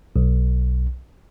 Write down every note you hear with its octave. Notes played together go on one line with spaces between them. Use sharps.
B1